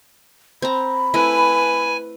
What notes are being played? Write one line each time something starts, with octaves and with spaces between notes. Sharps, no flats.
C4 A#5 B5
A3 E4 B4 G#5